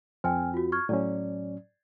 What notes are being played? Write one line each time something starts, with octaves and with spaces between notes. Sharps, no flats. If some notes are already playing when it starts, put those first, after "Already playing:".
F2 C4 G5 G#5 F6
F4 F#4
C#6 F6 G#6
A2 F#3 C#4 D5